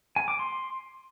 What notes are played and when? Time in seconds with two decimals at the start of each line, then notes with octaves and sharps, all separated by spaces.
0.16 G#5
0.28 D6
0.39 C6